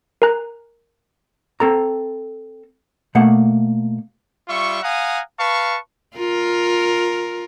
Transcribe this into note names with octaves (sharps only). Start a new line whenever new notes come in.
A#4 G#5 A#5 F#6
C4 A4 A#5
B2 A3 A#3 F#5
G3 F4 E5 C#6
F5 F#5 G#5 A#5 D#6
B4 F5 A5 C#6
F4 A#4